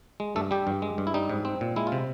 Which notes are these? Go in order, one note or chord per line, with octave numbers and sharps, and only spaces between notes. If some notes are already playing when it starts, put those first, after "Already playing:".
G#3
G2 A3 A4
G3 G4
G2
G#3
G2
E4
G3 D#4
G#2
C4
A#2
G#3 E4
F4
C3